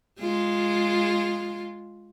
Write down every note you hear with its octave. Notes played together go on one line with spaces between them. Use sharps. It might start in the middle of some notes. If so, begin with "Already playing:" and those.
G#3 F4